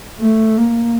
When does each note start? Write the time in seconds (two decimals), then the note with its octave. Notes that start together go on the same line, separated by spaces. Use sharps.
0.20 A3
0.57 A#3